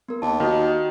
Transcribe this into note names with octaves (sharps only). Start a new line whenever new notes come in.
B3 A#4
D#2 A5
D#3 F#4 D#5